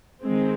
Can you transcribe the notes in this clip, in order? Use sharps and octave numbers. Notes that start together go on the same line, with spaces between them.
D#3 G#3 C4